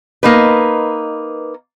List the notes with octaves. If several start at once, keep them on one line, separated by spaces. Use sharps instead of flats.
A#3 D#4 B4